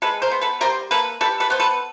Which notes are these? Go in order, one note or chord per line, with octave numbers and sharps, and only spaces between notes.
G#3 A4 B4
A#4 C5
B3
A4 B4
G3 A#4 C5
A#3 A4 B4
G3 A4 B4
A4 B4
B3 C5
A4 B4